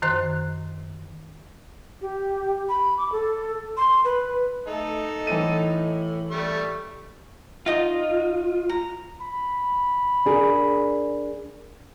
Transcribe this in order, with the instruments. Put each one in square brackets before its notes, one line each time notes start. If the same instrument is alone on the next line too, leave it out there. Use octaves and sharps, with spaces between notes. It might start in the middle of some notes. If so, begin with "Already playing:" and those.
[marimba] F#2 D#3 C5 C6 F#6
[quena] G4
B5
D6
A4
C6
B4
[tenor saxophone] A3 [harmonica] D#4 A4
[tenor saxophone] A2 [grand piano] E3 D#7
[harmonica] G3 A3 C#6
[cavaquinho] D#4 D#5 D#6 [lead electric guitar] F4
[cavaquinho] A#5
[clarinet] B5
[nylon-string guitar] D4 G#4 A#4